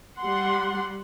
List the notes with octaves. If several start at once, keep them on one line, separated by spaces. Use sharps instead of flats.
G3 F#5 C6